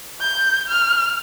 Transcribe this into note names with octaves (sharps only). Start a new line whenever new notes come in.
G6
F6